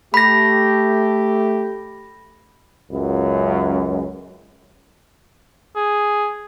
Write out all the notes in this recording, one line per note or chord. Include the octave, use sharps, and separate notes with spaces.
A3 G4 B5 A#6
C#2 F#2
G#4